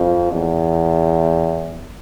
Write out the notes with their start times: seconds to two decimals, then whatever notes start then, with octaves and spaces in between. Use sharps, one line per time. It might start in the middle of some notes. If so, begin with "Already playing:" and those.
Already playing: F2
0.32 E2